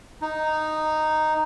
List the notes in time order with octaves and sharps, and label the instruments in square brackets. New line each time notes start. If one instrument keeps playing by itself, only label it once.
[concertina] D#4